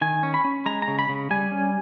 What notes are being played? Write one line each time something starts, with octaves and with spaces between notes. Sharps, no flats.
D#3 G#5
C#4
B5
C#4
G#3 A#5
A#5
C#3
B5
C#3
G3 G#5
C#4